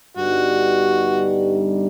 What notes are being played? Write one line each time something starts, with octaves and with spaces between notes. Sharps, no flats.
G2 D3 G3 B3 D#4 F#4